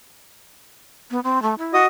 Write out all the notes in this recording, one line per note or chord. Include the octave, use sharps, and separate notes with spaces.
B3
C4
A3
E4
F#4 D#5 D#6